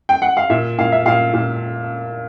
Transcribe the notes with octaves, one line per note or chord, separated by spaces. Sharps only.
G5
F#5
F5
A#2 E5
A#2 F5
E5
A#2 F5
A#2